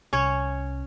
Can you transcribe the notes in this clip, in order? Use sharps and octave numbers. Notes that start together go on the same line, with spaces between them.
C2 C#4 C#5